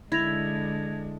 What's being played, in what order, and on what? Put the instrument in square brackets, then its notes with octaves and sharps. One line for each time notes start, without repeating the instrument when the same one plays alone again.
[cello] D3 G#3 [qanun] E4 [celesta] G#6 A#6 F7